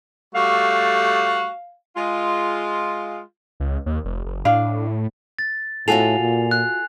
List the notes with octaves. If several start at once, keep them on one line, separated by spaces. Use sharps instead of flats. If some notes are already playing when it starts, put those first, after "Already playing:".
G3 A3 F#4 F5
G#3 F4
C#2
D#2
F1
F#1
A2 D4 F5
A6
A2 F4 F#4 A4 G#5 C7 F7
A#2
F#6